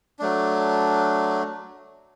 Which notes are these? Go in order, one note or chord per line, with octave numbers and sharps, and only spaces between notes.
F#3 A3 D4